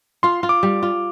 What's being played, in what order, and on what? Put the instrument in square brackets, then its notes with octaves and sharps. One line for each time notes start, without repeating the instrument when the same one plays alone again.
[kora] F4 [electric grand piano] C6
[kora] F4
[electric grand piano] D6
[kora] G3
F4